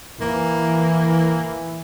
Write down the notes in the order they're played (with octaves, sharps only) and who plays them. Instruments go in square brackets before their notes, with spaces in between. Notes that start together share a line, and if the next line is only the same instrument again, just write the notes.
[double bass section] E3 [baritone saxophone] A#3